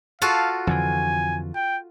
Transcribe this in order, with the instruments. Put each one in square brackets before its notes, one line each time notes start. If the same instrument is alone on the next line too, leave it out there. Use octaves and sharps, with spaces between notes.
[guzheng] F4 F#4 A4 [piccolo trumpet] F5
[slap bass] F2 D3 E3 [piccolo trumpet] G#5
[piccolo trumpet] G5